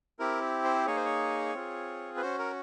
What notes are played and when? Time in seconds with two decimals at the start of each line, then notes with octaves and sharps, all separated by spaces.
0.19 C4 E4 G4 A#4
0.64 C5
0.86 A#3 D#4 G#4 C#5
0.96 C5
1.05 C#5
1.54 C4 F4 G#4
2.17 B4
2.21 C#4 F#4 C5
2.39 A#4